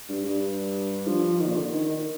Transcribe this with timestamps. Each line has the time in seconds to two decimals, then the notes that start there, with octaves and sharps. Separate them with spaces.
0.09 G2
0.25 G2
1.07 F3
1.39 D#3
1.47 A#2
1.56 D3
1.71 D#3
1.88 D#3